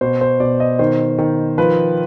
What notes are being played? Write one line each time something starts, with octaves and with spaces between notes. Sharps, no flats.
B2 C5
C5
B2 D5
D#5
D#3 C5
D#3
F3 B4